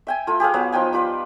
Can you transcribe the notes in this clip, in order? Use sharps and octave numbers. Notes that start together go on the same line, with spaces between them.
E5 G5 G#5
A3 F4
G4 G#4 B4 F5
F#3 B3 F5
F3 D#4 G5 G#5
G3 F4 B4 F5